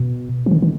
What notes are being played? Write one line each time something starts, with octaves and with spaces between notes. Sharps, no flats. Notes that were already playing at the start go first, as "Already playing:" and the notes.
Already playing: B2
F3
D#3
D#3